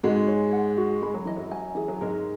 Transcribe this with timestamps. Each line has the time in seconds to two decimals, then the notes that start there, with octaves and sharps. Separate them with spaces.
0.03 G#2 G#3 F#4
0.28 C#5
0.52 F#5
0.77 F#4
1.02 G#3 B5
1.14 F#3
1.25 E3 D#5
1.36 F#2 F#3
1.51 G#5
1.75 E3 G#4
1.88 F#3
2.01 G#2 G#3 A#4